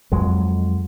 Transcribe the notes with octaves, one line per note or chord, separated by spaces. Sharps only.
F2 F#3 G#3